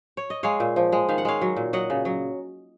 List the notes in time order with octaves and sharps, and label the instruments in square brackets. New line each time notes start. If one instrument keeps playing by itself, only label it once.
[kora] C#5
D#5
G#3 C#5 F5
A#2
F3
G#3
D#3 F5
F#5
G#3 C#5 F5
F#3
A#2
F#3 D#5 F#5
C#3
F#3